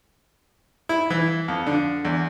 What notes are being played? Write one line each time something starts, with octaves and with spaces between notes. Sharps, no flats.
E4
E3
F2
D3
E2